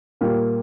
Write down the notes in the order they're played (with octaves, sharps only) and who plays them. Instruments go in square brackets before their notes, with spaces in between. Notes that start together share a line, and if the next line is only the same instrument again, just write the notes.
[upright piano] A#2 G3 A#3